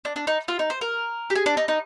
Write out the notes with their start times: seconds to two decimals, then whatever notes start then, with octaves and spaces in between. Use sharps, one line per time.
0.05 D4
0.16 D4
0.27 D#4
0.48 F4
0.59 D#4
0.70 C5
0.81 A#4
1.30 G4
1.35 G#4
1.46 D4
1.57 D#4
1.68 D#4